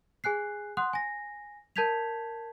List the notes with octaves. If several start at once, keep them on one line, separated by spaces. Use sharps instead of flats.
G#4 G#5 F#6 C7
F#5 C6 D#6 F#6
G#5 A#6
A#4 A5 G6 G#6 B6 F7